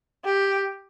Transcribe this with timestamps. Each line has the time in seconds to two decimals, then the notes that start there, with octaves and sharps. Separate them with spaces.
0.25 G4